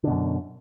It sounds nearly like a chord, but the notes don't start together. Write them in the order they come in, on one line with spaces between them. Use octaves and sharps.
D3 B2 F#2